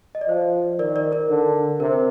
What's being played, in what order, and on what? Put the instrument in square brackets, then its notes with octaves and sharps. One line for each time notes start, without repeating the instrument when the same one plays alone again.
[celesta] D#5
D5
[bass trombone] F3 [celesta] C5
[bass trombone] D#3 [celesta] A#4 D5
[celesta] A#4 D5
A#4 D5
[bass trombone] D3
[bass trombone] C3 [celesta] A#4